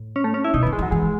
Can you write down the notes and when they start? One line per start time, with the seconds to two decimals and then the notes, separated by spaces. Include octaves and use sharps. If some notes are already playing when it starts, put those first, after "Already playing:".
Already playing: A2
0.16 C#4
0.24 A3
0.34 C#4
0.44 E4
0.54 B2 D#4
0.63 B3
0.66 D#3
0.73 G#3
0.79 E3
0.83 F#3
0.91 E3 G#3